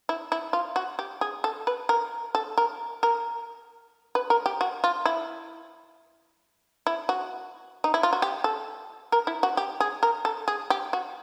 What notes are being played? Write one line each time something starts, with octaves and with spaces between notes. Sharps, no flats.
E4
E4
F4
F#4
G4
G#4
A4
B4
A#4
A4
A#4
A#4
B4
A#4
G4
F#4
F4
E4
E4
F#4
D#4
E4
F4
F#4
G4
A4
A#4
E4
F#4
G4
G#4
A#4
A4
G#4
G4
F#4